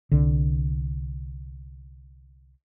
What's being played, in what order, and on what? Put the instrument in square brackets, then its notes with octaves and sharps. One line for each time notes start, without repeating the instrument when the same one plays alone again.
[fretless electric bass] C2 D3